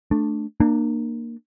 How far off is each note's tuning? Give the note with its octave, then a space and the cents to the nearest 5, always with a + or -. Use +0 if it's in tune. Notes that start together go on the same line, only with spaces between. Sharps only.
A3 +0 D4 +10
A#3 +0 D4 +35